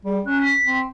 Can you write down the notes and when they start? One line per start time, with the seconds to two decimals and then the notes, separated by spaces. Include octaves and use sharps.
0.05 G3 G#4
0.26 C#4 F#6
0.41 B6
0.66 C4